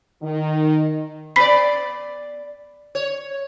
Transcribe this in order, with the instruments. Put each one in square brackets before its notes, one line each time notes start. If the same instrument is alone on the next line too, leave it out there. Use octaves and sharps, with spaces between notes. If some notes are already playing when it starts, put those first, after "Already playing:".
[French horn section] D#3
[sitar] B3 D5 [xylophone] B5 B6 C7
[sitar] C#5